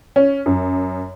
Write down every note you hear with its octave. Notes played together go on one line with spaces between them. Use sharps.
C#4
F#2